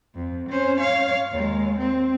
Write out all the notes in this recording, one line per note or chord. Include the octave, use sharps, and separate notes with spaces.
F2
C#4 C5
C#5 F5
D#2 G#3
C4